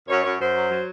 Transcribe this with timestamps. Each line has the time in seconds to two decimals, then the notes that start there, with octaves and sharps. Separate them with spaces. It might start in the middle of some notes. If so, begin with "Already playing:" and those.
0.08 F#2 C#5
0.23 F#2 C#5
0.39 F#2 C5
0.55 F#3
0.70 F#3